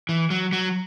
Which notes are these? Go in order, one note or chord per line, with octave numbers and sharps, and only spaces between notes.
E3
F#3
F#3